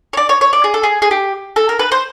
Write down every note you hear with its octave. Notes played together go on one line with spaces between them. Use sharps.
C#5
D5
C#5
C#5
D5
G#4
A4
G#4
G#4
G4
A4
A#4
B4
C5